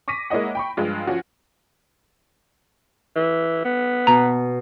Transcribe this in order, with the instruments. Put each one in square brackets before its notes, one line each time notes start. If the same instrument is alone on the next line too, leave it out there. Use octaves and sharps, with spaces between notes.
[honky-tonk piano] C#6 D6 A#6 B6 D#7
G#3 A#3 E4 C#5 D#5 F#5
G5 B5 C#6
G2 F3 G#3 F4
F3 C#4 F4 F#4
[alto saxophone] E3
B3
[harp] B2 [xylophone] A#5